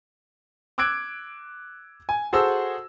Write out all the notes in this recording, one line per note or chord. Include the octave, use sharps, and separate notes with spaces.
D6 E6 F#6 G#6 D7
G#5
F#4 G#4 A4 C5 E6